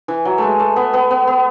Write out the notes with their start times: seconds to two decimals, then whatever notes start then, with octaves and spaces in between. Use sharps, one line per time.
0.08 E3
0.25 F#3
0.38 G#3 A3
0.59 A3
0.76 B3
0.93 B3
1.11 B3
1.27 B3